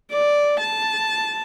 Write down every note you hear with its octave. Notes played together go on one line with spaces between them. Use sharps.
D5
A5